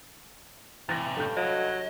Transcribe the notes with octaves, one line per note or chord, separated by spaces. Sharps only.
A2 C3 E3 A6 A#6
G2 A4 G6
F#3 D#5